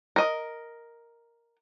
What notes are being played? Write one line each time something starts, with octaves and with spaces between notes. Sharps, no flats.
A#4 D#5